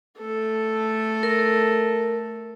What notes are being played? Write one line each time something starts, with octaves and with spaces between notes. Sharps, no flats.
A3 A4
A#4